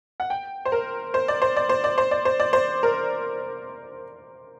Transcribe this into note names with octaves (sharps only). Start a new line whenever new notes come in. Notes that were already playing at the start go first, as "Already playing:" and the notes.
F#5
G5
C5
A#4
C5
D5
C5
D5
C5
D5
C5
D5
C5
D5
C5
A#4